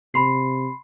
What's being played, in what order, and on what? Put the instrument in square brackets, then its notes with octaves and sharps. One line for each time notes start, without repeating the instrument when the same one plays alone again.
[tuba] C3 [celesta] B5 C6 C7